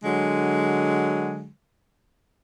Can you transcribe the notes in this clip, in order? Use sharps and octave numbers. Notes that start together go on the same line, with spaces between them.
D3 F#3 G#3